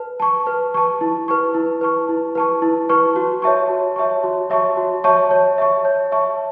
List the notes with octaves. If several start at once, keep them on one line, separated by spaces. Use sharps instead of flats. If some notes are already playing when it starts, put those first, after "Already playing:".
Already playing: B4 A5
A5 C#6
B4
A5 C#6
E4
B4 A5 C#6
E4
B4 A5 C#6
E4
B4 A5 C#6
E4
B4 A5 C#6
F#4
C#5 E5 A5 C#6
F#4
C#5 E5 A5 C#6
F#4
C#5 E5 A5 C#6
F#4
C#5 E5 A5 C#6
C#5
E5 A5 C#6
C#5
E5 A5 C#6